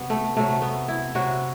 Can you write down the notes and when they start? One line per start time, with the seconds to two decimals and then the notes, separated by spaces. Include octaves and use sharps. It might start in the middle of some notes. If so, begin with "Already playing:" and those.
Already playing: C3 F#3 B3
0.10 A3
0.37 C3 F#3 A3
0.62 B3
0.88 E4
1.15 C3 F#3 F#4